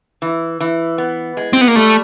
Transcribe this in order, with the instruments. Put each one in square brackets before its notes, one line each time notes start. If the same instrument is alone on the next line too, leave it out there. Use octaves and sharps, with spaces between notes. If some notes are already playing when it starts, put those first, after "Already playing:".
[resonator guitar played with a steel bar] E3
E3
B3
G#3
[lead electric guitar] C4
B3
A#3
[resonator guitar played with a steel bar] G3 [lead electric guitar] A3